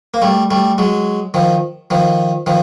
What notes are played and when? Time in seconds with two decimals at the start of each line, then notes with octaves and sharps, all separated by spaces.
0.14 A#3
0.22 G3 A3
0.51 G3 A3
0.78 F#3 G#3
1.34 D#3 F3
1.90 D#3 F3
2.46 D#3 F3